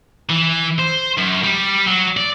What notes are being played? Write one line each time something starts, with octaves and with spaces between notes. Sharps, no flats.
E3
C5
F#2
G3
F#3
D5